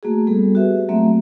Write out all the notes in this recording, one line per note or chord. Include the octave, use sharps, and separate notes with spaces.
A3 A#3 F#4 G#4
G3 B3 G#4 A4
F#4 G4 B4 E5
F#3 A3 A#3 C4 E5